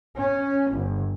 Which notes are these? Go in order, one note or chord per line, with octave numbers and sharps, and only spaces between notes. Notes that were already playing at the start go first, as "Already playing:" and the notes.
C#4
G1